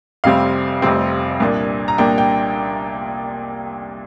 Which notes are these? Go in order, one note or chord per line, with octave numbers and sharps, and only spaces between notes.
F1 F2 C3 G3 C4 F5
F1 F2 C3 G3 C4
C2 A#2 A#3 D4
A#5
C2 A#2 A#3 D4 G5
G5